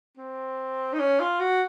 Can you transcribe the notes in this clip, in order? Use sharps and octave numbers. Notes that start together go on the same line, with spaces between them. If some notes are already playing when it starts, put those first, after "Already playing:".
C4
D#4
C#4
F4
F#4